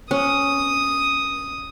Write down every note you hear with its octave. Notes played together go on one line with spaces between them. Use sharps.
C#4 D#6